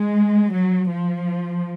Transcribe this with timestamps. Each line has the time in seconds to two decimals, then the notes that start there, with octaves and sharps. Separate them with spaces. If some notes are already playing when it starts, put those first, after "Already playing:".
Already playing: G#3
0.51 F#3
0.90 F3